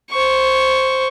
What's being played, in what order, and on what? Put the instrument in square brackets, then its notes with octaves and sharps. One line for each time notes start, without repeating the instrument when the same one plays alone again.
[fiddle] C5 C#6